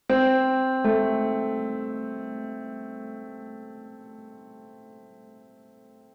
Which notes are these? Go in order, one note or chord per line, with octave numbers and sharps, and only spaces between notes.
C4
A3